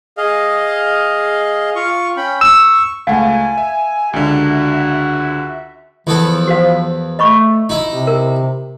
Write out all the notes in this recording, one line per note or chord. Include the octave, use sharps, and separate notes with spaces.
G#4 D#5 F5
F4 F5 C#6
C#4 G5 B5
C#6 E6
C#2 A3 F5 F#5 G#5 A5
E5
C#2 D3 F#4 E5
E2 F3 B3 A4
F#4 C5 F5
A3 D#5 B5 C#6
D#4 E4
C3
A#4